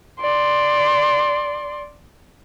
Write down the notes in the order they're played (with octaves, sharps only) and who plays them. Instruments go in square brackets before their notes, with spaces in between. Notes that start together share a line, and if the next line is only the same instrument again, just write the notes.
[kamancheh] D5 C6